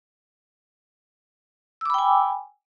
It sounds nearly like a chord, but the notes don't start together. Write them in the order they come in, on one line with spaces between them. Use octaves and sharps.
E6 D6 B5 G5 G#5